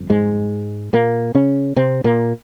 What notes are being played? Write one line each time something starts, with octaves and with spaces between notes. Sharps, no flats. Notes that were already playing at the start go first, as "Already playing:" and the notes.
Already playing: G1 F2
G#2 G#3
A#2 A#3
C#3 C#4
C3 C4
A#2 A#3